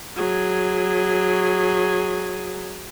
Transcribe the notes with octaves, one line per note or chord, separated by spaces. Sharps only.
F#3 G#4